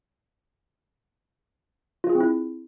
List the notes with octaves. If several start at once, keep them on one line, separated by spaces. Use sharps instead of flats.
F4
G#4
C4
E4